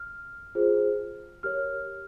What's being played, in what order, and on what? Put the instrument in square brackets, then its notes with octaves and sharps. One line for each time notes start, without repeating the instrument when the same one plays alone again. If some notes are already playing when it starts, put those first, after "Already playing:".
Already playing: [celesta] F6
F4 G#4 C5
G4 A#4 C#5 F6